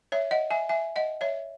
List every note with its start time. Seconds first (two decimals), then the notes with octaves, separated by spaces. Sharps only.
0.12 C#5 E5
0.31 D#5 F#5
0.51 E5 G#5
0.69 E5 G#5
0.96 D#5 F#5
1.21 C#5 E5